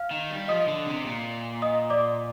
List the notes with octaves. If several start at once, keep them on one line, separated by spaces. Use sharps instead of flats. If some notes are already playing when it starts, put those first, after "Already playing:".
Already playing: F5 F6
D#3
G3
F3 D#5 D#6
D3
C3
A#2
D#5 D#6
D5 D6